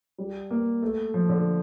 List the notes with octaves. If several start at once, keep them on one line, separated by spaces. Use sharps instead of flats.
G3
A#3
A3
F3
D3